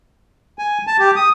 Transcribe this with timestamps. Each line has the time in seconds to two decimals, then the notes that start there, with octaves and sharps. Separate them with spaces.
0.59 G#5
0.87 A5
1.00 G4
1.16 D#6